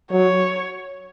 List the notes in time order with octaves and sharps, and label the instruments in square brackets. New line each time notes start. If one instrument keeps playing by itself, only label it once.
[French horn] F#3 [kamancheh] C#5